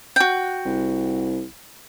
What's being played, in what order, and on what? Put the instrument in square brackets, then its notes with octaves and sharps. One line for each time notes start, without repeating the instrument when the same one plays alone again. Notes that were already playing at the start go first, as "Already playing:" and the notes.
[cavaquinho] F#4 G5
[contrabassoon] C2